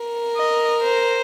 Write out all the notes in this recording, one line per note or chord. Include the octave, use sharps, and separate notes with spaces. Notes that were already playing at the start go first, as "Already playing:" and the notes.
Already playing: A#4
D#5
C5